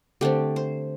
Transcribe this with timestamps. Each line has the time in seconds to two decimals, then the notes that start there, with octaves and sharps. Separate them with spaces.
0.21 D3 A3 C4 G4
0.56 C5